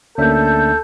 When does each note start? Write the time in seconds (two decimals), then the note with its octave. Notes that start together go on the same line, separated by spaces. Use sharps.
0.18 D2 A#3 C#4 D4 A4 E5 G6